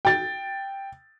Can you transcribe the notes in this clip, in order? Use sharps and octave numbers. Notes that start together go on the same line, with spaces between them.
G5 A6